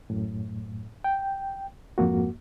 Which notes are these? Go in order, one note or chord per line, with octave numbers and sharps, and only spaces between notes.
F#2 A2
G5
F2 G#2 A#3 F#4